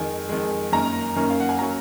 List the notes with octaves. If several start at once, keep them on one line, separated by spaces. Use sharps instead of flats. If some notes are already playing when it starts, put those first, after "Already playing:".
Already playing: F2 D#3 G#3 G#5
F2 D#3 G#3
F#2 D#3 A#3 C#4 A#5
F#2 D#3 A#3 C#4
F5
F#5
G#5
F#3 A#3 C#4 A#5